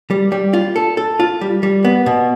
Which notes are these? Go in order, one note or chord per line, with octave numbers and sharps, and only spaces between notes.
G3
G3
F4
A4
A4
F4
G3
G3
B3
B2